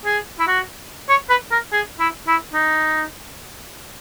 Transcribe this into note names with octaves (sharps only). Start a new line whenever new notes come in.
G#4
E4
F#4
C#5
B4
A#4
G#4
E4
E4
D#4